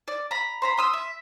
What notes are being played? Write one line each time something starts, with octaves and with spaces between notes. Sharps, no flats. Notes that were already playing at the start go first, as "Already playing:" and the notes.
D5
A#5 B5
C5 A#5 B5
C6 D#6 E6
E5